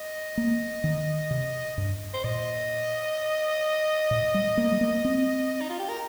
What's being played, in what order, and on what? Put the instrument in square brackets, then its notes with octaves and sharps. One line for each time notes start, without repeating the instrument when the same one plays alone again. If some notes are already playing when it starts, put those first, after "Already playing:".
Already playing: [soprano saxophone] D#5
[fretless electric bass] A#3
D#3
C3
G2
[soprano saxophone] C5
[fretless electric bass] A#2 [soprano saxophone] D#5
[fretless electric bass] A#2
G3
A#3
G3
A#3
C4
[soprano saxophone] D#4
F4
G4
A#4